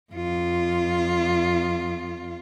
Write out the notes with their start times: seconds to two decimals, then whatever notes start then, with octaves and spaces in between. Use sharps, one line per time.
0.13 F2 F4